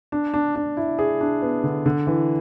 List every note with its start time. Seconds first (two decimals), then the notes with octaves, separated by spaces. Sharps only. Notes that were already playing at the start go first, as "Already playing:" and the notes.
0.12 D4
0.34 D4
0.55 D4
0.77 E4
0.99 G#4
1.21 D4
1.42 B3
1.63 D3
1.86 D3
2.07 E3